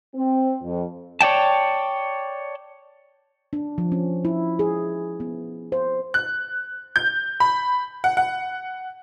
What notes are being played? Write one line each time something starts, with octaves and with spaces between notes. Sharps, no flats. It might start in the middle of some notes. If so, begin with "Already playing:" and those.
C4
F2
C#5 D5 G5 A5
D4
F3
C#4
E4
G#4
B3
C5
F#6
G6
B5
F#5
F#5